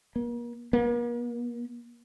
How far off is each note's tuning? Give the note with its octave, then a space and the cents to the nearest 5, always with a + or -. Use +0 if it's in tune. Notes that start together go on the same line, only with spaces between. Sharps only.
A#3 +40
A#3 +45